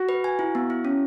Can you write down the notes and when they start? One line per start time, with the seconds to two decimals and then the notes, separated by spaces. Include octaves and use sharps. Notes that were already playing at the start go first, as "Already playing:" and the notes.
Already playing: F#4
0.09 B4
0.24 G#5
0.39 E4
0.55 B3
0.70 E4
0.85 C#4